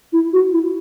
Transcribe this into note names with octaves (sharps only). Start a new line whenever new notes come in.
E4
F#4
E4